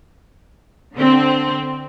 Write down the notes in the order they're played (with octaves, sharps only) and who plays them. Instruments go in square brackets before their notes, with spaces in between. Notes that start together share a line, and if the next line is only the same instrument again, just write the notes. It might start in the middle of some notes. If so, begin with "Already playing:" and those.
[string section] D3 C4